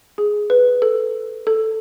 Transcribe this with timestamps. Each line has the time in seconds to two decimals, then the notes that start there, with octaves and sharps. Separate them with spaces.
0.18 G#4
0.50 B4
0.82 A4
1.47 A4